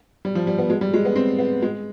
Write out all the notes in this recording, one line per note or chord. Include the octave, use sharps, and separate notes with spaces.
G3
F3
G3
B3
G#3
G3
G#3
B3
C4
B3
G#3